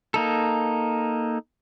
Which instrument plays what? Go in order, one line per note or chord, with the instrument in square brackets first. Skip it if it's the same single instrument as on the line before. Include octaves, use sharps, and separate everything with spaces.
[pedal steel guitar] A#3 D#4 A4